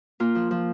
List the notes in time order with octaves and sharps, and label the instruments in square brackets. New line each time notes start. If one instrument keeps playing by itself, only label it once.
[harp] A#3 F4
F3
F3